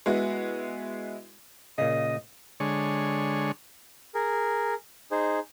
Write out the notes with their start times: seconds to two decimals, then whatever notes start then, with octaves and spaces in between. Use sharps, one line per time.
0.06 G#3 B3 E4 F#4
1.78 A#2 C#3 D#5
2.60 D3 G#3 C#5
4.14 G#4 A#4
5.11 D#4 G#4 C5